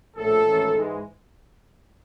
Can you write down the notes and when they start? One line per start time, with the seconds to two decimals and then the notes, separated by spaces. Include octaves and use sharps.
0.15 A#1 A2 F3 A3 A4
0.43 G#1 G#2 E3 A3 C#4
0.73 G#2 E3 G#3